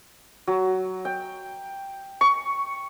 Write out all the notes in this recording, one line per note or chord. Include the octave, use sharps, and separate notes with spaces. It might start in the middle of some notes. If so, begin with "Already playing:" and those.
F#3
G5
C#6